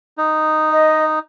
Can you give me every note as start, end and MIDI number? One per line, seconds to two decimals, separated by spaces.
0.18 1.19 63
0.71 1.05 75